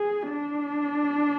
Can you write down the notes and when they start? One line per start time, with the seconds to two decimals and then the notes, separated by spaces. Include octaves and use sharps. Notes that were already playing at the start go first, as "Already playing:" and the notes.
Already playing: G#4
0.32 D4